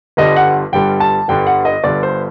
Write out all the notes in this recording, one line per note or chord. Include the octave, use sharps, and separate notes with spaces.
G1 G2 D3 G3 D#5
F#5
G1 G2 D3 G3 G5
A5
G1 G2 D3 G3 G5
F#5
D#5
G1 G2 D3 G3 D5
C5